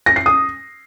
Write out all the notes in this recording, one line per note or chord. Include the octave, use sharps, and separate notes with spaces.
A#6
C7
D#6